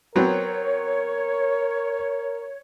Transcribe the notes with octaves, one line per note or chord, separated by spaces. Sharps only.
F#3 B3 C4 A#4 C#5